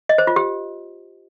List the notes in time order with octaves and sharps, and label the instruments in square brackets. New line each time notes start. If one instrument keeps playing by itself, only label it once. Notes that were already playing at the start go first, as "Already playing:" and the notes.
[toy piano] D#5
C5
F4
G4